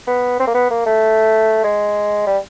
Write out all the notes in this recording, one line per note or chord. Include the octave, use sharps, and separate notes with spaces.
B3
C4
A#3
B3
A#3
A3
G#3
G3